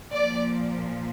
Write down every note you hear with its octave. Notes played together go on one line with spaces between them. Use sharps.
A#2 F3 D5